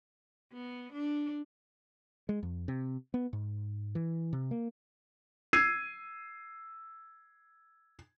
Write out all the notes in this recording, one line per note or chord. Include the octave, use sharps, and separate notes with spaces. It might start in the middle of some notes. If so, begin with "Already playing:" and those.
B3
D4
G#3
F2
C3
B3
G#2
E3
C3
A#3
E6 G#6 C7 D#7